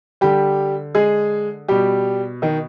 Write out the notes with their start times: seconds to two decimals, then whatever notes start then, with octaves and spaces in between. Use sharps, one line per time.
0.21 D3 G3 G4
0.95 G#3 G#4
1.68 B2 G3 G4
2.42 D#3 D#4